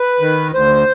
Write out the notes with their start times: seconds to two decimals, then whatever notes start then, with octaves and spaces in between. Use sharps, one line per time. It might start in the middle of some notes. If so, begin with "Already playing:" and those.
Already playing: B4
0.20 D#3
0.54 D2 C5